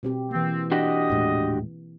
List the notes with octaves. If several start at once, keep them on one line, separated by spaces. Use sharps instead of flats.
B2 C4 G4
E3 A#3 C4
D4 F#4 G4 D#5
D#1 A2 G#3